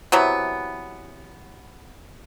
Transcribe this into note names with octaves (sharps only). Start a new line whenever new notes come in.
C3 E3 F#3 B3